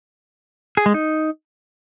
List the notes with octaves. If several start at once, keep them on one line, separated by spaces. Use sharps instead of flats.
G#4
G#3
D#4